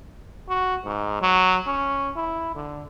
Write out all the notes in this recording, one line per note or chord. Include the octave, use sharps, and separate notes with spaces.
F#4
G#2
F#3
C#4
E4
D3